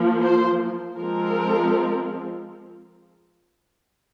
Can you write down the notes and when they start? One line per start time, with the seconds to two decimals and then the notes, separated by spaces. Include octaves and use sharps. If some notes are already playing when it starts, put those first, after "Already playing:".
Already playing: F3 A#3
0.21 C5
0.98 F3 G#3 C4 A#4